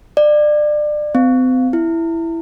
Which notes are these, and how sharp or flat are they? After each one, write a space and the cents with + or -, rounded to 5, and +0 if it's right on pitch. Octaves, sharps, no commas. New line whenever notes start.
D5 +25
C4 -40
E4 +5